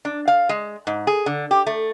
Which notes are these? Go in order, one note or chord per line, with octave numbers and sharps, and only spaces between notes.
D4
F5
G#3
G#2
G#4
D3
G4
A3